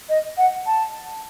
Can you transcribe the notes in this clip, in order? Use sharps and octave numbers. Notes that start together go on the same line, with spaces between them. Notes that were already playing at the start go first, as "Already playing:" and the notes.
D#5
F#5
A5